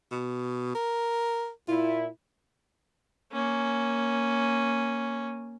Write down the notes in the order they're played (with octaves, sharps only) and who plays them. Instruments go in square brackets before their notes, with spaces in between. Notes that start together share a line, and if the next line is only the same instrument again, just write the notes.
[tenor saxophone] B2
A#4
[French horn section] A#2 E4 [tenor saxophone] F4
[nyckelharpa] A#3 C#4